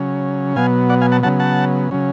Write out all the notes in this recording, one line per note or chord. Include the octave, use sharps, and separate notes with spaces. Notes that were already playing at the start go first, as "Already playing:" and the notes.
Already playing: C#3 F#3 C#4
B2 F#3 B3 F5 G#5
D5 F#5
F5 G#5
F#5 A5
C#3 F#3 B3 F#5 A5
F#5 A5
C#3 F#3 C#4